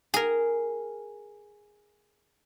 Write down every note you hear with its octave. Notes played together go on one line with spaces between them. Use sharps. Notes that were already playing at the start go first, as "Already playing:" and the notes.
G#4 A#4